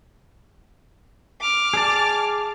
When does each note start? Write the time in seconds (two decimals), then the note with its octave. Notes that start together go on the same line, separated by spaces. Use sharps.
1.41 D6 F6
1.74 G#4 D5 A5